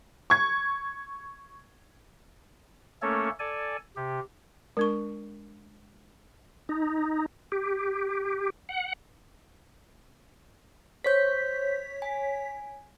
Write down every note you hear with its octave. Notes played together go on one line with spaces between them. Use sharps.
C#6 G#6
A3 A#3 C#4 A4 C#5
A4 D5 G#5
C3 G4
G#3 D4 A#4 C#6
D#4
G4
F#5
C5 C#5 G6 B6
G#5